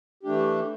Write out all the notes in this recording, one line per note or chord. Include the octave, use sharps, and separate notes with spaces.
E3 A3 D4 G4